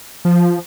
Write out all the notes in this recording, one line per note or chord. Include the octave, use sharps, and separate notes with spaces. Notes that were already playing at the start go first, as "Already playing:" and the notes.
F3